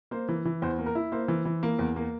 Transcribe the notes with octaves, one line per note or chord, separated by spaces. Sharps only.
A#3 C5
E3
E3
E2 C5
A#3
A#4
E4
A#3 C5
E3
E3
A#3
E2
A#3